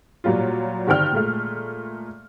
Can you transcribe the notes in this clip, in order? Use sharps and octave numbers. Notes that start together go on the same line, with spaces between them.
A#2 F#3 G3 F4
G2 D3 D#3 C4 G5 F6
A#2 G#3 A3